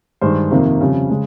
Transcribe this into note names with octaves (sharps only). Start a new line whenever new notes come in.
G2 D#3 G#3 C5
F2 C3 D#3 A#3
F2 C#3 G3
C#3 G#3